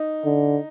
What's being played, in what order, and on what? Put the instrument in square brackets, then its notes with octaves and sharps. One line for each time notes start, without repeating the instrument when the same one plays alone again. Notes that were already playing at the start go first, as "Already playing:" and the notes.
Already playing: [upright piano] D#4
[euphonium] D3